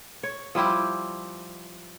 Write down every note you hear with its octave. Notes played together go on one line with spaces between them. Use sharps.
C#5
F3 G3 E4 G4